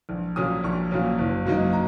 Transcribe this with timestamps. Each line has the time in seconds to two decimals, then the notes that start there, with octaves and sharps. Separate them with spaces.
0.09 A#1
0.36 A#2 F#3 A#3 C#4 D#6
0.64 A#1 C#6
0.91 A#2 F#3 A#3 C#4
1.18 F#1
1.46 F#2 F#3 A#3 D#4
1.73 A#5